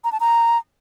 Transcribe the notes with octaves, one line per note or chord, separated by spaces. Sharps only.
A#5
A5
A#5